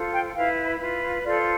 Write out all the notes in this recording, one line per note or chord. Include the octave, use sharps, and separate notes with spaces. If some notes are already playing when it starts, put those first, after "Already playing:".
Already playing: F4 A4 C5
G5
E4 B4 F5
F4 B4
F4 A4 C5 D5